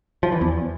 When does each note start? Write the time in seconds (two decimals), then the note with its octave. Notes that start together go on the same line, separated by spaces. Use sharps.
0.23 F3
0.32 E3
0.41 E2